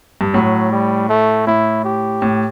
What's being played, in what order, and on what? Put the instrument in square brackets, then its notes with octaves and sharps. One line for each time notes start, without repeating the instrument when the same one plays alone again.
[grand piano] G2
[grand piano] A2 [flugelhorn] F#3
[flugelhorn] G3
A3
[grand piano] A2 [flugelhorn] E4
[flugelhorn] G4
[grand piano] A2